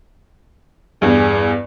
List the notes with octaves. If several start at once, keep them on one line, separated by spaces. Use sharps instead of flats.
E2 G2 G#4